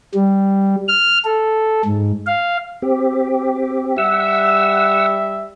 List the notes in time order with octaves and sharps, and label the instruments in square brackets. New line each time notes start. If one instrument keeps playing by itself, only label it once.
[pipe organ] G3
F6
A4
G#2
F5
[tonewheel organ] C4 G4
[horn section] G3 E5 [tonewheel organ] F#5 E6